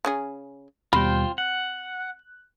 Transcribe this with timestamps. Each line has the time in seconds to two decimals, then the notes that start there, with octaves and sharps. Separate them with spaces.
0.05 C#3 C#4 G#4
0.93 D#2 B2 G3 C4 F4 C5 G5 B5
1.38 F#5 F#6